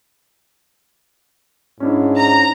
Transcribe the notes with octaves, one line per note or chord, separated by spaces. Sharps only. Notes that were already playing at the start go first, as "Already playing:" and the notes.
G#2 C#4 D4 E4
A#5